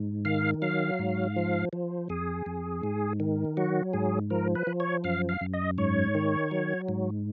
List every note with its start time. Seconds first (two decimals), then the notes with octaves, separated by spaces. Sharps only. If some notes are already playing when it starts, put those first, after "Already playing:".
Already playing: G#2
0.25 D#3 F5
0.62 F#3 F5
0.99 G#2
1.36 F3
1.73 F3
2.09 F2 G#4
2.46 F2
2.83 G#2
3.20 D#3
3.57 F#3 F#4
3.93 G#2 G#4
4.30 F3 A#4
4.55 B4
4.67 F3
4.80 C#5
5.04 F#2 F5
5.29 F5
5.41 F#2
5.53 D#5
5.78 G#2 C#5
6.15 D#3
6.51 F#3
6.89 G#2